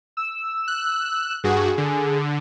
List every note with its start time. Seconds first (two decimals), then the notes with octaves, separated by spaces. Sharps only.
0.17 E6
0.68 F#6
1.44 G2 F#4 G#4
1.78 D3